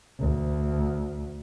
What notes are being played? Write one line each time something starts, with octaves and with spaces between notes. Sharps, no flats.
D2